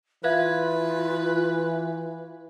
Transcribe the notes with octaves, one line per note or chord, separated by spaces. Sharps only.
E3 F4 B4 E5 F5 G#6